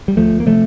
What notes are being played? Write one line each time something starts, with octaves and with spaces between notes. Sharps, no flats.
G3
D2 F3 A3
A#3
C3 F3 A3